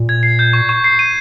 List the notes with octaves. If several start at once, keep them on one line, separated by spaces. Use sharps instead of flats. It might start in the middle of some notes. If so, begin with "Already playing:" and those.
Already playing: A#2
G#6
C7
G6
C#6
C#6
C7
D#7